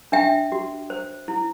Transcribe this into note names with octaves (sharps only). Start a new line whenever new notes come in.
D4 E5 G5
F#4
C5
E4